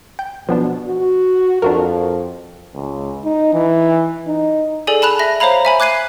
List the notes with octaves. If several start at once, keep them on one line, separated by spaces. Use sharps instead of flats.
G5
B2 F3 B3 D4
F#4
F2 D4 F#4 A#4
C#2
D#4
E3
D#4
G#4 A4 D5 G#5
A5 B5 F#6 F7
E5 A#6
C5 C#5 F5 A#5 B5
E5 G#5 B5
D6 F#6 G#6 C7 D#7